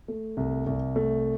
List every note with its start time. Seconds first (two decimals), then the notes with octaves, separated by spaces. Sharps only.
0.08 A3
0.37 C2
0.67 C2
0.96 A3